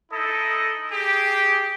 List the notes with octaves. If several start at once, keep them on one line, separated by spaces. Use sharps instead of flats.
D#4 E4 A4 D#5
G4 G#4